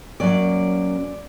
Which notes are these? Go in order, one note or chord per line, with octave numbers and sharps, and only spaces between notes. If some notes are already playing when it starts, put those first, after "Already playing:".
F#2 D#3 F#3 A#3 C#4 D5